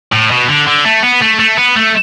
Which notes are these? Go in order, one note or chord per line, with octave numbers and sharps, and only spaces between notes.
A2
B2
D3
D3
A3
B3
A3
A3
B3
A3